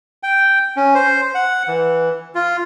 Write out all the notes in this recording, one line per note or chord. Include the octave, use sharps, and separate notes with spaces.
G5
C#4
C5
F#5
E3
F4